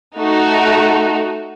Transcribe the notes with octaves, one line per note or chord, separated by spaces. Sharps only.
A3 D#4 F#4